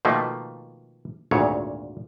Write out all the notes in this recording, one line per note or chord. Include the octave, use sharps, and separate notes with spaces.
B2 D#3 F3 A3 A#3
G#1 D2 A#2 C#5